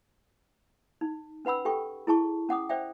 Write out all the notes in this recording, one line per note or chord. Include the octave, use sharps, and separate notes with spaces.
D#4
C#4 B4 F#5 B5 E6
G4 A4 G5 C#6
E4 G#4 A5 C#6
C#4 F#5 D6 D#6
C5 D5 E5 G5